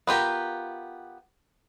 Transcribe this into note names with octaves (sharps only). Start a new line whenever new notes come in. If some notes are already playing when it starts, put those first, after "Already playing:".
B3 F4 G4 A#4